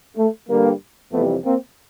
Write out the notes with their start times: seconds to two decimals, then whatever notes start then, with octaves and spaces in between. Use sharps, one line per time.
0.17 A3
0.49 G2 D3 G3 A#3
1.12 F2 C3 E3 G3 A3 B3
1.44 A#3 C4